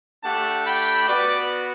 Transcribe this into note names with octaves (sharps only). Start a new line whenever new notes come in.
A3 D4 G4 F#5 A5
G5 B5
B3 F#4 B4 D5